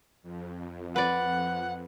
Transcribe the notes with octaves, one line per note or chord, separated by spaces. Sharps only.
F2
B4 D5 F#5